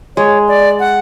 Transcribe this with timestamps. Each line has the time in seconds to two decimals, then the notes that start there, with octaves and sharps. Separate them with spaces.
0.16 G#3 C#5
0.48 D5
0.80 F#5